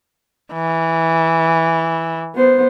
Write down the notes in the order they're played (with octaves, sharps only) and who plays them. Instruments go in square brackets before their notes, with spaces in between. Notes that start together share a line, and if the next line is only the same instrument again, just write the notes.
[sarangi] E3
[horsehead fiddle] B3 C5